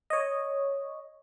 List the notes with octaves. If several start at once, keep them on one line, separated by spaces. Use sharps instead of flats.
C#5 D#5